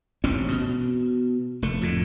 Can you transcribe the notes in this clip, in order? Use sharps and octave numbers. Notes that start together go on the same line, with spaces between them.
E1 A1 C4 C#4
B2
F1 A3
F2 A2 D3